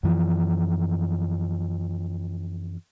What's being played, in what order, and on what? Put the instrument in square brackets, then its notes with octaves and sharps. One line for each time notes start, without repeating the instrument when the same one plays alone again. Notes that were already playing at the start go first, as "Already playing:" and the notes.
[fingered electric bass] F#2 E3 F3